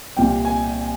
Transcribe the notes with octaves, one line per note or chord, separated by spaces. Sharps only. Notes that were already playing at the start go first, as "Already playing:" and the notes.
C2 A#2 G3 G5
G#5